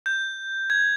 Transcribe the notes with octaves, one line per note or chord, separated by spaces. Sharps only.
G6
G#6